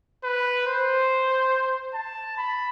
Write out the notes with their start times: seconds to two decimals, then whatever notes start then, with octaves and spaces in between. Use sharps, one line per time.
0.24 B4
0.67 C5
1.94 A5
2.37 B5